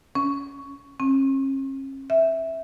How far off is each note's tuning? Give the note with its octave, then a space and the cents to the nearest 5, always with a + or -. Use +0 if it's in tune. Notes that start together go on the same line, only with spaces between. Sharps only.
C#4 +10
C#4 -45
E5 -10